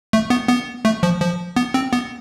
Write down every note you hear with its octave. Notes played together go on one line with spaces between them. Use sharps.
A3
B3
B3
A3
F3
F3
B3
C4
B3